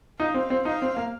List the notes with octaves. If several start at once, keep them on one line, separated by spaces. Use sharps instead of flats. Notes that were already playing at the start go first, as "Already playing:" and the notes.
D#4 F5
C4
C4
D#4 F5
C4
A#3